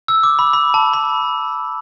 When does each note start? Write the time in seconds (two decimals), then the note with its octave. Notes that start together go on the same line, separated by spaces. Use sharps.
0.08 E6
0.23 D6
0.39 B5
0.53 B5
0.74 A5
0.94 B5